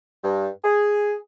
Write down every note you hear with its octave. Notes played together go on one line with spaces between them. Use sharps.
G2
G#4